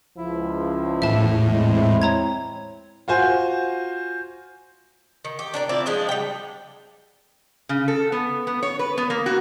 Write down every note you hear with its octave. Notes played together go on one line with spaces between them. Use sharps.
C#2 F3 E4
E2 A2 E5 A5
G#3 C4 E4
C#5 A#5 G#6
F4 F#4 C5 G#5
D#3
G4
D4 A#4 D5
C4 E4 F4 D5
F3 G#3 D4 D#4
G3 G5
C#3
A4
B3
B3
C#5
B4
B3
A#3
F#4